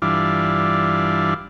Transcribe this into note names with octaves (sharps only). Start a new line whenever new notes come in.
G2 E3 D4 F4